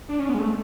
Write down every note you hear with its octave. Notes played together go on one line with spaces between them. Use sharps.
D4
C#4
B3
G#3
A3